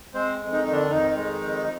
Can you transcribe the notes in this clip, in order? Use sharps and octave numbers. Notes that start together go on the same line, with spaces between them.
G#3 C4 C5
F2
D#3 D#4
D#3
D3 D4
F2 D#3 D#4
G#3
F2